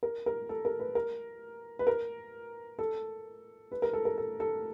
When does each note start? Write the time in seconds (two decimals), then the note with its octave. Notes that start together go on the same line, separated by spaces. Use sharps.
0.03 A#4
0.26 A#4
0.49 A4
0.65 A#4
0.79 B4
0.95 A#4
1.79 B4
1.87 A#4
2.79 A4
3.72 B4
3.82 A#4
3.93 A4
4.05 A#4
4.18 A4
4.40 A4